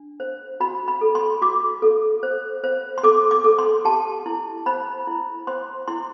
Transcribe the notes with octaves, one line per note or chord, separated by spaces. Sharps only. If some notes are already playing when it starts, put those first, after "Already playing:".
Already playing: D4
C5
F#4 B5
B5
A4
C6
F#4 D6
A4
C5
C5
C6
A4 D6
D6
A4
C6
G4 A5
E4
C5 B5
E4
C5 C6
E4 C6